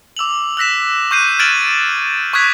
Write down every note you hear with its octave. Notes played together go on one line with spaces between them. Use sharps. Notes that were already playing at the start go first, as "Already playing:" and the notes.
D6 E6 F7 F#7
E6 F#6 A#6 B6 E7
C#6 F#6 G6 C7 D#7
F6 G#6 A6 D7 E7 F#7
C#6 D#6 F#6 G#6 B6